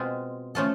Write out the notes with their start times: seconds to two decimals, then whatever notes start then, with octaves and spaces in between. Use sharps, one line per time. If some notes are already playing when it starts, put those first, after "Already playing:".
Already playing: B2 G#3 C4 F4
0.55 F3 A3 C#4 F4 A4